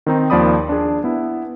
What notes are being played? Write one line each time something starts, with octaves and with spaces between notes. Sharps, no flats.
D#3 C4 D#4
D#2 F3 D5 B5 D#6
D4 G#4
B3 E4